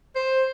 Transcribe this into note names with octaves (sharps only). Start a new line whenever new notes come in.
C5